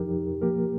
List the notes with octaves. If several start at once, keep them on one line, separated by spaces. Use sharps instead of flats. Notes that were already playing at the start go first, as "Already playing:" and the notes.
Already playing: F2 F3 D#4 G4 A#4
F3 A#3 G4 A#4